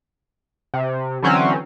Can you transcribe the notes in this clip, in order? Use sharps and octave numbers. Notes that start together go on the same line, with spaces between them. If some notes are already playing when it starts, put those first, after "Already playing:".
C3
D3 E3 F#3 C4 C#4